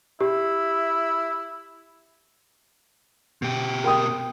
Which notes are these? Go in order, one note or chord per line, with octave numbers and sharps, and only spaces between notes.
E4 G4
B2 G4
A#4 G5 D#6